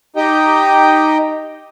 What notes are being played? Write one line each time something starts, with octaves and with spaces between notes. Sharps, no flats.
D#4 G4 D#5 G5